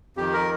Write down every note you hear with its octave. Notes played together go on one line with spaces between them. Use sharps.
F2 D#3 G4
A#4